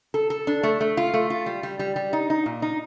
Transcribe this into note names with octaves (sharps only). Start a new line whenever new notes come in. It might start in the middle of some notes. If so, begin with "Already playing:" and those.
A4
A4
D4
A3
A3
F4
A3
F4
G3
G3
G3
G3
D#4
D#4
A#2
D#4